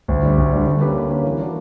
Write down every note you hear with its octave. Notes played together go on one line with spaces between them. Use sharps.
D2
D3 G3
D2
D3 G3
D3
A#3 C#4 G4 B4
D3
A#3 C#4 G4 B4
E3
A#3 D4 F#4